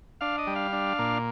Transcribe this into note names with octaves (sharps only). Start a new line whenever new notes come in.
D4 F5
D#5
G3
F5
D4
A#2